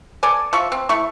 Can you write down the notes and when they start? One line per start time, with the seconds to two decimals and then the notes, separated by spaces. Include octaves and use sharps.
0.23 A4 D5 G#5
0.53 F3 E5 C#6
0.72 C4
0.89 A3 E4 C#6